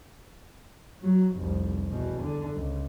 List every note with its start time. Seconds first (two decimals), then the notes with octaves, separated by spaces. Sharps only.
1.02 F#3
1.36 F1 C2
1.90 E2 B2
2.22 D3
2.55 C#2